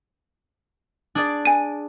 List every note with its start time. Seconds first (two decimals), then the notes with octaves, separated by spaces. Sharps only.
1.15 D4 G#4 D5
1.45 G#5 D#7